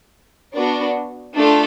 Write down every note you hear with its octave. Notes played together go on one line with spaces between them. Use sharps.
B3 D4 F#4
A3 D4 F4 A4